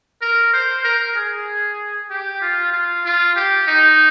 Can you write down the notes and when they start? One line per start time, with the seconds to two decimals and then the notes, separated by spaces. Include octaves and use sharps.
0.22 A#4
0.54 C5
0.84 A#4
1.16 G#4
2.10 G4
2.42 F4
2.73 F4
3.05 F4
3.36 G4
3.68 D#4